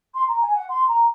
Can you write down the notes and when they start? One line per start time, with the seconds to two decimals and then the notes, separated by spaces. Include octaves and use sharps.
0.14 C6
0.28 A#5
0.41 G#5
0.55 F#5
0.69 C6
0.87 A#5